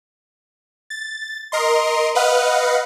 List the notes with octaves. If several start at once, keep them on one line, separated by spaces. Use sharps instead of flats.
A6
A#4 D#5 C6
B4 D#5 F5 F#5